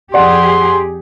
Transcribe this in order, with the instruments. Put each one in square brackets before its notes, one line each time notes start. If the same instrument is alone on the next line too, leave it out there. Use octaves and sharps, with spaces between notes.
[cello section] F2 G4 G#4 [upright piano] D5 F#5 [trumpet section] C6